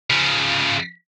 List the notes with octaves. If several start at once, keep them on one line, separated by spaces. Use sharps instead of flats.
C#3 F3